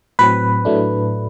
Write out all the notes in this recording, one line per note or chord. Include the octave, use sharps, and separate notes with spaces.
A2 F#3 C4 B4
A2 F#3 A3 D4